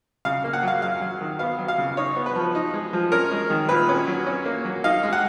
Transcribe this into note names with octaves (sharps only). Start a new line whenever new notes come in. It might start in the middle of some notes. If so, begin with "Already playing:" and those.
C#3 F5
A#3
F#5
F#3 F5
F#2 F5
F#3
D#3
B3 F5
F#3
F5
C#3
D#4 C#5
B3
B4
F3
D#4
G#3
F3
C#4 A#4
G#3
D#3
A#2 B4
C#4
F#3
C#4
A#3
F#3
D#4 F5
G#3
F#5